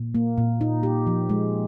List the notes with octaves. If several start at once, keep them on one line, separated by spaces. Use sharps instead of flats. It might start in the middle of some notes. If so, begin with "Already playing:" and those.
Already playing: A#2
A#3
A#2
D#4
G4
F3
G#3